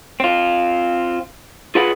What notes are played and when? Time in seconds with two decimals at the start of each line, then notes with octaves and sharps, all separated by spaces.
0.20 C4 F4
1.75 F4 G#4 B4 F#5 B5